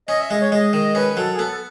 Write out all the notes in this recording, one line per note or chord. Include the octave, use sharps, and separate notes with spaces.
C#4 D#5
E5
G#3 D#5
C#5
G#3 D#5
D#3 D#5
C#4 B4
F#3 A4
G#4
B3 A4